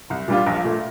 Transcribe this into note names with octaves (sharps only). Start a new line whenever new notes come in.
C2
A#2 G3 D4 F4
A#1
A#2 A3